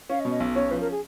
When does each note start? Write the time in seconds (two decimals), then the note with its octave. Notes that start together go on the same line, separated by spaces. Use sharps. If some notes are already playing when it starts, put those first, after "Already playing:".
0.10 C#4 F5
0.20 D#5
0.25 B2
0.30 D#5
0.40 B1
0.56 C#4 C#5
0.70 F3 B4
0.80 A#4
0.91 G#4